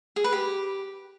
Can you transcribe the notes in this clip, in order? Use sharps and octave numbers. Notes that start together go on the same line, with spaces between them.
G#4
B4
G4